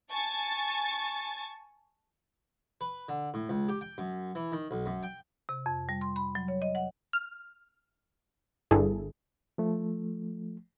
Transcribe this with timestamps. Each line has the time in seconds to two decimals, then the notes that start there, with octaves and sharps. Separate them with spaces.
0.11 G#5 A5 C#6 A6
2.81 B4
3.09 D3
3.34 A2
3.49 C#2
3.69 G4
3.81 G5
3.98 F#2
4.35 E3
4.52 D#3
4.71 B1
4.86 F#2
5.03 G5
5.49 C3
5.66 F2
5.89 G3
6.01 C6
6.16 B5
6.35 F#3
6.48 C#5
6.62 D#5
6.75 F#5
7.13 F6
8.71 G1 G2 E4 G#4 A4
9.58 F3 A3